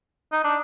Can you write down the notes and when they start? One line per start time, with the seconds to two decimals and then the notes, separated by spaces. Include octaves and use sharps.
0.32 D#4
0.44 D4